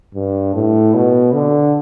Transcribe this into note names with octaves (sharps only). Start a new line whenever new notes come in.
G2
A2
B2
D3